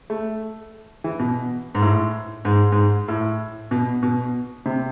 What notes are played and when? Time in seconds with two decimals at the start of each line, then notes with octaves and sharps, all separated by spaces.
0.10 A3
1.04 E3
1.19 B2
1.75 G#2
1.82 A2
2.45 G#2
2.72 G#2
3.08 A2
3.71 B2
4.03 B2
4.66 C3